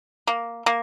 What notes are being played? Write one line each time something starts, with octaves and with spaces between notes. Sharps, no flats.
A#3
A#3